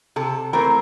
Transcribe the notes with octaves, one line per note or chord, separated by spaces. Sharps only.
C3 A4
E3 A3 C4 A#4